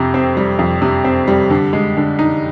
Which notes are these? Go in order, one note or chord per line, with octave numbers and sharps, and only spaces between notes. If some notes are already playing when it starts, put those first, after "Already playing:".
Already playing: F2 C3
C4
G3
F2
C3
C4
G3
D3
G#3
D3
D#4